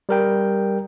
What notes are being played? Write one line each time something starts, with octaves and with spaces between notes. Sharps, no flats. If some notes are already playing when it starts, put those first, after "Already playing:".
G3 A#4 G5